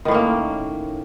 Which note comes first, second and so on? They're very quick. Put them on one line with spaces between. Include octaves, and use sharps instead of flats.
D#3 A2 C#4 A#3